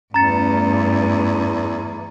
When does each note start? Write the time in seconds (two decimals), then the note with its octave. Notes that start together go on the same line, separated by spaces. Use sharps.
0.14 E2 G2 A3 C#4 A#5 A6 C#7